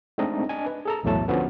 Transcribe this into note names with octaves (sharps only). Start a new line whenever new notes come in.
G#3 A3 C4 D4 D#4 D#5
D4 D#5 G#5
B4
G#4 A4 A#5
B1 E2 A2 F#3 A3 A5
D3 F3 B3 C#4 F#4 B4